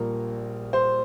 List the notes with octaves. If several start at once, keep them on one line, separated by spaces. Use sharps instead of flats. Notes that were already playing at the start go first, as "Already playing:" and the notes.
Already playing: A#1 A#2 G3 A#3 A#4
C5